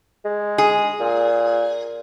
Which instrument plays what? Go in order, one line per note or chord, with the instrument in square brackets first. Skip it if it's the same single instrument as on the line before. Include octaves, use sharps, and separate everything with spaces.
[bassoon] G#3
[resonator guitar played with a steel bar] G#4
[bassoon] A#2